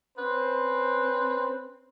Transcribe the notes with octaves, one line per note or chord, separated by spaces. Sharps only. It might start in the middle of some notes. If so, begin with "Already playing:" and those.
C4 C#4 B4 C5